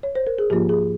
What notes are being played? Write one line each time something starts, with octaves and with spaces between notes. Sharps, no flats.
C#5
C5
A#4
G#4
G#2 F3 A#3 F4 G4
G#4